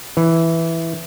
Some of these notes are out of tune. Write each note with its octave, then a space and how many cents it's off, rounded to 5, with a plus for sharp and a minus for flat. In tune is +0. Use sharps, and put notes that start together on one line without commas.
E3 +0